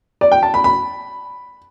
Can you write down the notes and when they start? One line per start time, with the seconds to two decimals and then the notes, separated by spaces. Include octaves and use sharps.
0.21 D5
0.32 G5
0.43 A5
0.54 B5
0.64 B5